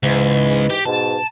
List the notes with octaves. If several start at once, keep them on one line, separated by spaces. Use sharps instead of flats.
C#2 G#2 E3
G4
G#2 B2 A5